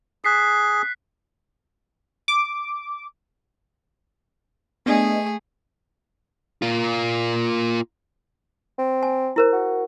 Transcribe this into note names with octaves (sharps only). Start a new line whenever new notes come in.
G#4 F#6 B6 C7
D6
A3 B3 D4 G#4 D#5 G#5
A#3 F4
C4
G#5
E4 A#4 C5
F#4